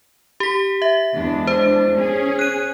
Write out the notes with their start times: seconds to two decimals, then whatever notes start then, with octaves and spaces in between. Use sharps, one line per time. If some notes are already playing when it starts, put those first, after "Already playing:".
0.40 G4 B6
0.82 E5
1.14 E2 G#3 D4
1.47 C5
1.95 C#4 G#4
2.39 F#6 D#7